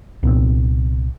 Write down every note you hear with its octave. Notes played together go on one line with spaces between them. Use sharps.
C2 A#2 C4